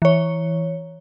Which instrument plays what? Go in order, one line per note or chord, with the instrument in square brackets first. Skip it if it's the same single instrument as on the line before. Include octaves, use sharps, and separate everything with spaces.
[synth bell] E3 C#5